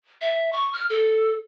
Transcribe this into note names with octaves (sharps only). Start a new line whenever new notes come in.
E5
C#6
F6
A4